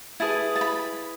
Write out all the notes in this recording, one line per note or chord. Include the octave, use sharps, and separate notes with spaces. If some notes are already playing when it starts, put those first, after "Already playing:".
E4 G#4 B4 A5
A5
B5